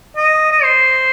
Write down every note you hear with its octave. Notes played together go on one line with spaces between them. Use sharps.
D#5
D#5
C5